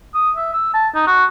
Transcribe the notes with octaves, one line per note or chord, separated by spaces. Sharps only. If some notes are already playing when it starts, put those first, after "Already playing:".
D#6
E5
E6
A5
D#4
F#4